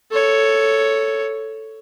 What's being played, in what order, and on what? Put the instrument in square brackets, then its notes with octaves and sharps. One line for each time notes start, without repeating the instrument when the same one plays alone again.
[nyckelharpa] A4 C#5